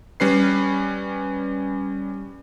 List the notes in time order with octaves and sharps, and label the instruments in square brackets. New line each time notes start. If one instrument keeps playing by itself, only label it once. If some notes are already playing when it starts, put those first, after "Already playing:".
[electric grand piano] G3 C#4 B4 C7